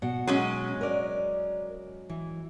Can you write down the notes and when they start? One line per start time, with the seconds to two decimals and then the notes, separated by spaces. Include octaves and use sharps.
0.02 B2 F#5
0.27 F#3 G#3 C#4
0.81 A#4 D5
2.09 E3